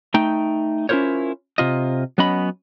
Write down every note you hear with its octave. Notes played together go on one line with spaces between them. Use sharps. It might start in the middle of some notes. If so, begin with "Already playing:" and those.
A3 D#4 G5
C#4 E4 F4 A#4 C5 C#5
C3 F4 D#5
F#3 B3 C#4 D#5 B5